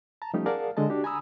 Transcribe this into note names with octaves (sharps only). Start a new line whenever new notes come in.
A5 A#5
F3 G3 A3 C#4 D#4 G4
G#4 A#4 D5 F5 F#5 A5
D3 G#3 D#5 A5
D4 F#4 G4
G#5 A#5 B5 D#6 E6